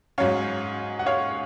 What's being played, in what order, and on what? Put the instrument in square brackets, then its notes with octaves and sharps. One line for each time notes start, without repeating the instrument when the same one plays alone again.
[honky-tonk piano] G#2 F#3 C#4 [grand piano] C#5 F5
[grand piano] F#5
C#5 F5